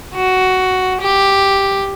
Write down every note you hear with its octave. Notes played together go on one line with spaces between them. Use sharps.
F#4
G4